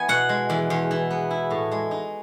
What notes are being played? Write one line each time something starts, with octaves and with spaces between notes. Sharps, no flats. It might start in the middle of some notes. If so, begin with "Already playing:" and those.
Already playing: E3 B3 G#5
B2 F#5
G#3
E2
E2
E3
B3
E4
A2
G#3
D#4